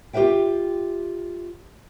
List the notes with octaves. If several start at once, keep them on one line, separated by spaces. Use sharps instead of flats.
F4 G4 G#4 B4 E5 G5